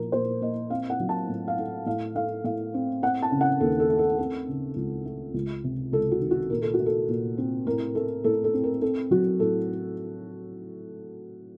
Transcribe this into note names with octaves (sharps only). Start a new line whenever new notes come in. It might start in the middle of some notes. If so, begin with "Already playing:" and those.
Already playing: A#2 F3 A#4
A#2 C5
A#3 D#5
C4 F5
F#5
F#3
A5
A2
F5
A3
A2 F5
A3 F5
A2 F5
C4
C4 F#5
A5
C#3
F#5
D#2 A4
A4
A3
A4
C4 A4
C#3
C#2
A3
C#2
C3
C#2 A4
F#4
D#3
F#4
A#2 A#4
A4
F#4
A3
A4
A#2
C4
A2 A#4
A3 A4
A2 A4
A4
C4
A#4
C4 A4
F#3 F#4
A2 A4